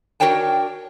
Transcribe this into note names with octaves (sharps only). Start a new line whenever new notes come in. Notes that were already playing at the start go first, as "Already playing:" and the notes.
D4 F#4 A#4 C#5 G5 A5